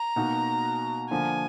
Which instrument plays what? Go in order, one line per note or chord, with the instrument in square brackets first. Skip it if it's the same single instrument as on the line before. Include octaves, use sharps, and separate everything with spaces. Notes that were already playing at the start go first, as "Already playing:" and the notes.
Already playing: [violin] A#5
[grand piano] B2 A#3 D#4 F#4
[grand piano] D3 F3 A#3 [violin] G#5